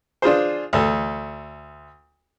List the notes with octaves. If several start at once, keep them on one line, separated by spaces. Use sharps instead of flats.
D4 F4 G#4 C5
D2 A4